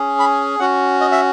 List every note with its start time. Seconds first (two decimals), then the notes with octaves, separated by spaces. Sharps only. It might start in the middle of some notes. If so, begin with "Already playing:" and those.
Already playing: C#4 G#4
0.19 B5
0.60 C#4 F#4 F#5
1.01 D#5
1.12 E5